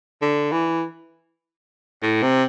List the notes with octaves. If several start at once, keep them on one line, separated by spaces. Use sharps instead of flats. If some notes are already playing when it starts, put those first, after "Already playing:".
D3
E3
A2
C3